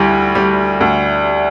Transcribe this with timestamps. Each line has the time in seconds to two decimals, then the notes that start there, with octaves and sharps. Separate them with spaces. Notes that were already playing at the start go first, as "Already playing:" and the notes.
Already playing: D2 G3 E4
0.35 G3
0.81 D2